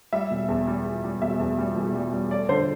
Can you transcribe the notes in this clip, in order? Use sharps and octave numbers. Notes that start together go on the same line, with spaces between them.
G3 E5
E1
E2
G3
G3
G3
E1 E5
E2
G3
E1
G3
G3
A3 D5
D3 C5